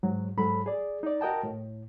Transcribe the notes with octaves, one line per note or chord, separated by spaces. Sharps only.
G#2 F#3
G#2 F#3 A4 B5
G#4 D5
D#4 D5
F#4 A#4 D#5 G5 A5
A2